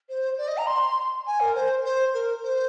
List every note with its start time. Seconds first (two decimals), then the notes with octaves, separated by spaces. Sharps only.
0.09 C5
0.38 D5
0.48 D#5
0.58 A#5
0.67 C6
1.27 G#5
1.40 A#4
1.55 C5
1.84 C5
2.14 A#4
2.43 C5